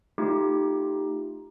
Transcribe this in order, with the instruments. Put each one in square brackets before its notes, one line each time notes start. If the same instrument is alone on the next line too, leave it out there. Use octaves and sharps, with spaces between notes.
[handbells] A3 D#4 F4 G4